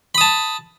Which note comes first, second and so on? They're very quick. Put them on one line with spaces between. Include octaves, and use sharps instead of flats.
B5 D#6 A5